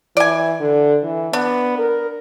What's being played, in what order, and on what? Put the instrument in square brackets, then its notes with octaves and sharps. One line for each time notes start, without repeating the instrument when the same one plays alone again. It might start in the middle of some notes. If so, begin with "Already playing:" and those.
[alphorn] E3 [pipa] D5 G#5
[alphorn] D3
E3
[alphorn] B3 [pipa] D4
[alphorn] A#4